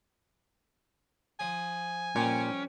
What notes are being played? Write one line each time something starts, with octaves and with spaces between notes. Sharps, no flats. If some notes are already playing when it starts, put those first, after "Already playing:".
F3 G#5 D#6
F2 A#2 G3 C#4 G5